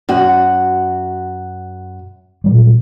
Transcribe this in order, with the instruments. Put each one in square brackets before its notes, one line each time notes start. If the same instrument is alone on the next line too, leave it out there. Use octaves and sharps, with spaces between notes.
[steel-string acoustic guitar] F#2 F#4 F#5
[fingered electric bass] A#2 F#3 G3